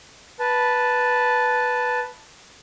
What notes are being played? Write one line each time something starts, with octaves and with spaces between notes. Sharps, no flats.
B4 A5